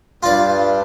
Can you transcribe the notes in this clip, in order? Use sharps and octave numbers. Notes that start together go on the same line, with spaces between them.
G2 F4 D5